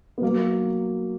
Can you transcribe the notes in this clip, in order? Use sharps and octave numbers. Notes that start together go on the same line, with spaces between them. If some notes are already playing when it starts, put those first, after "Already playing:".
B3
F#3 A#3